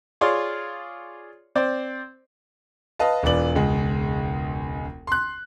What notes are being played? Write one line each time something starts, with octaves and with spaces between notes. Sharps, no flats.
F4 G#4 C#5 D5 C6
C4 C5 D5
B4 D#5 F5 A5
E1 E2 F4 B4 D5 F#7
E1 C#2 G#3
C6 F#6